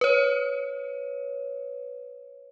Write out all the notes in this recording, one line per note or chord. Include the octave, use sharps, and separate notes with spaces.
B4 C#5